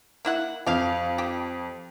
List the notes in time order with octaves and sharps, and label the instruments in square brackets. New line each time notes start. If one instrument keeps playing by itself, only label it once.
[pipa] A#3 E4 F#5
[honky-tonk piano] F2 [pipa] G4 F5
[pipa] G4